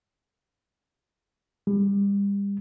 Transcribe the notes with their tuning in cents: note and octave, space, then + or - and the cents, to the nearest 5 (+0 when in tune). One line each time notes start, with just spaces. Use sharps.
G3 +35